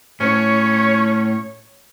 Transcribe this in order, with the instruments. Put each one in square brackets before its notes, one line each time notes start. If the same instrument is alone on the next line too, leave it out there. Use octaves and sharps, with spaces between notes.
[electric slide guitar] A2 [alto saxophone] C#4 [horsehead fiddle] C#5